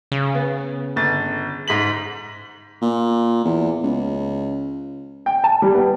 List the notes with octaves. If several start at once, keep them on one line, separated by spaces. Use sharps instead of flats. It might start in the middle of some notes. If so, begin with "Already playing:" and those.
C#3
B3
G1 A6
G#2 B6 F#7
A#2
E2
C#2
G5
A5
G3
B3